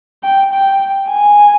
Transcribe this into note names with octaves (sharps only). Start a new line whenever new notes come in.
G5
G5
G#5